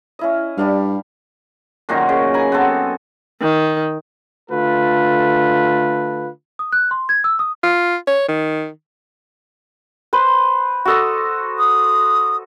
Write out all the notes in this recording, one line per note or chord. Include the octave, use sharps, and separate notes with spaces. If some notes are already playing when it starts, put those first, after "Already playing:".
C#4 E4 D#5
G2 G3 D4 F5
F#2 A#2 D#3 D#4
C#3
G#5 A#5 B5
B3 C4 A4
D#3
D3 A3 F4 A4 B4
D#6
F#6
C6
G#6
E6
D#6
F4
C#5
D#3
B4 C5
F#4 A4 D#5
D#6